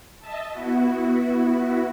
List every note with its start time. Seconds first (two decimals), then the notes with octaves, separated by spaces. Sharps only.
0.19 D#5 E5 A5
0.51 B3 E4 F#4